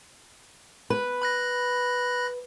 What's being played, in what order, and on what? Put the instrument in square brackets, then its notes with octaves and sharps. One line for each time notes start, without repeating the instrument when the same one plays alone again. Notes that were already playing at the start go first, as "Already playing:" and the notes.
[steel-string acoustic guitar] B4
[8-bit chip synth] B5 F#6 A#6